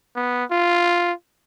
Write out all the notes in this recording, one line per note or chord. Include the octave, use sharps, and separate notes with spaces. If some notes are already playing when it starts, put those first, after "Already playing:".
B3
F4